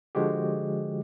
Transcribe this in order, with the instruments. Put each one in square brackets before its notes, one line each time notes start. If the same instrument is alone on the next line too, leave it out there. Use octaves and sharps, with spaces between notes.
[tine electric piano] D3 F3 G#3 F#4 G4